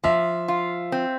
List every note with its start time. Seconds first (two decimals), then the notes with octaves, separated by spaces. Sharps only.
0.04 F3 E5
0.48 F4
0.92 C4